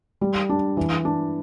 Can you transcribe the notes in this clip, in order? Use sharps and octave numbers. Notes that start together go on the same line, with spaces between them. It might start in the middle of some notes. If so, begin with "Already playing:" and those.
G3
D4
E3
D4